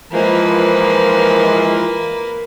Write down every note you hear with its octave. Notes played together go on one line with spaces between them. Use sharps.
E3 F3 G#3 A#3 B4